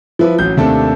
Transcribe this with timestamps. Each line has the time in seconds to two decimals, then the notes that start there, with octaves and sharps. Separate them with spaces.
0.19 F3 E4 B4
0.38 A1 F#3 G6
0.57 D#2 C3 A3 D4 A4 A5